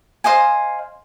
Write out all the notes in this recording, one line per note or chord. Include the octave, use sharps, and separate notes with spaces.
C5 D#5 F5 G#5